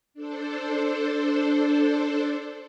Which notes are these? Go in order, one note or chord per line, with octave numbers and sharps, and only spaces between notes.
D4 A4 C5